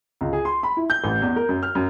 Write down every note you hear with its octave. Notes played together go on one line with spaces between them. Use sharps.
C#2
G#4
C6
B5
E4
G6
A1
E2
A#4
F#2
F6
F#2